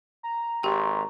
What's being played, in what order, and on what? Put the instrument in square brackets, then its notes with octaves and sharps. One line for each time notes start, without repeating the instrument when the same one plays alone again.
[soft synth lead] A#5
[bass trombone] G#1 [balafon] G4 G5 [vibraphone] C6 C#6